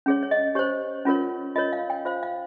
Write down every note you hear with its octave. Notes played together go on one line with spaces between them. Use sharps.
C#4 G#4 C#5
C#5
D#5
G4 C5 C#5
C#4 F4 A#4 C#5
F4 A#4 C#5 D#5
F5
G5
F4 C5 F5
F5